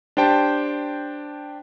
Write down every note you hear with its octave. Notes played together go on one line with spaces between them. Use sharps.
D4 G4 C5 G5 A5